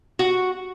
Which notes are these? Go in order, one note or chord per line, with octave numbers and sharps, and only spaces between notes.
F#4